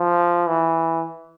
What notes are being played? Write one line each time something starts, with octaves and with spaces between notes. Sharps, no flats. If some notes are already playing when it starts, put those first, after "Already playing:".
Already playing: F3
E3